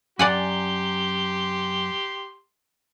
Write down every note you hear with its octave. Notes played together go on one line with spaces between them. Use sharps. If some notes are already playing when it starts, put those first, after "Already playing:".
F#2 G4 D5 F#5 G#5 C6